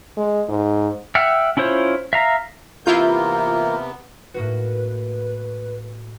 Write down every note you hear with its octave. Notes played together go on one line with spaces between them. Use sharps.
G#3
G#2
E5 F#5 G5 F6
C#4 E4 F4 C5 C#5
E5 F5 A#5
C3 E3 A#3 B3 E4 F4 A#4 G6
A2 A#3 F#4 B4